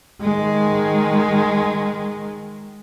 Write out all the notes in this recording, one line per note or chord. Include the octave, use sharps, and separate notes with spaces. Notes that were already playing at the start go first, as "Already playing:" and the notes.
D#3 G#3